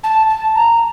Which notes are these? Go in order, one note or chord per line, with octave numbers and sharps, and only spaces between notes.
A5
A5
A#5